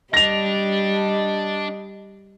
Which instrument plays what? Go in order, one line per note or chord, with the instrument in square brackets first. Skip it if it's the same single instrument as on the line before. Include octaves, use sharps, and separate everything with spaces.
[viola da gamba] G3 [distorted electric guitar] D4 [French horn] D#5 [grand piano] A#6 F7